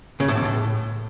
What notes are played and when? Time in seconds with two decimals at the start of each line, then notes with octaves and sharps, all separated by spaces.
0.20 C#3
0.28 A2
0.37 E2
0.45 A2